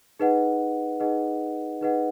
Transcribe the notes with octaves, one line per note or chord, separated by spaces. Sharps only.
D#4 G#4 B4 D#5 F#5
D#4 G#4 B4 D#5 F#5
D#4 G#4 B4 D#5 F#5